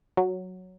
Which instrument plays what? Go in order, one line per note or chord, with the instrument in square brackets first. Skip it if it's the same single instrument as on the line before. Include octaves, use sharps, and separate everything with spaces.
[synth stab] F#3